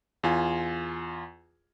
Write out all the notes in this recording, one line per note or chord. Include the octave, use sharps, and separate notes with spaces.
E2 F4 G#5